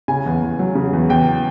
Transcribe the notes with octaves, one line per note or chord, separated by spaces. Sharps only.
C#3 G#5
E2
E2
F#3
C#3
E2
E2 G5